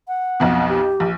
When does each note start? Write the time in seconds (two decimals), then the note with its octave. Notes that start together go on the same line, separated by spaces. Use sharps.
0.08 F#5
0.40 B1 F2 B2
0.69 G4
1.00 A#1